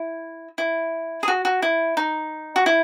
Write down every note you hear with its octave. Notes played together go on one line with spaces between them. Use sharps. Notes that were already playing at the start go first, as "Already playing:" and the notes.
Already playing: E4
E4
G#4
F#4
F#4
E4
D#4
F#4
E4